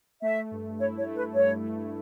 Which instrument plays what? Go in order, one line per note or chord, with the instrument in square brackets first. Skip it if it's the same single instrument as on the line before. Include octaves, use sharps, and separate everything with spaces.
[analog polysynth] A3 [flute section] E5
[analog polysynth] G2
[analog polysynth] E4 [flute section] C#5
[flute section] C#5
[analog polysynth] A3
[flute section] B4
[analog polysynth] G2 [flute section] C#5
[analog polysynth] A3